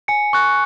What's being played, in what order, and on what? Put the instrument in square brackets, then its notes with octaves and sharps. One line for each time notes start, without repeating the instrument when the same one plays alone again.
[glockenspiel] G#5 C#7
C#6 F#6